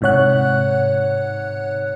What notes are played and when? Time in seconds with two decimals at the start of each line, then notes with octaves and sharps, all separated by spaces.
0.01 G1 G#2 C3 C#5 F#5 F#6